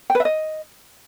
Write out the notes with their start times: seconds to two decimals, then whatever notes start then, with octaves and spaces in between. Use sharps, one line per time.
0.10 G5
0.15 B4
0.20 E5
0.25 D#5